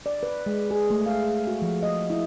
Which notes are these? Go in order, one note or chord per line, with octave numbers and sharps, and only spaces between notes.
D5
B4
G#3
G#4
A3
F5
F#4
F3
D#5
E4